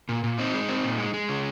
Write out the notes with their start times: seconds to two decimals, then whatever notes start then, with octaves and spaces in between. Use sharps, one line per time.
0.09 A#2
0.24 A#2
0.38 C4 D#4
0.54 G#3
0.69 C4
0.84 A#2
0.98 G#3
1.14 G#3
1.29 C#3